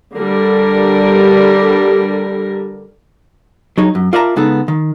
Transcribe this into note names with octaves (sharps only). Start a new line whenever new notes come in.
D3 G3 A#4
F#3 D#4 G#4 C#5
F#2
F4 A#4 D5 E5 A5 A#5
C#3 G#3 B3 D#4 A4
D#3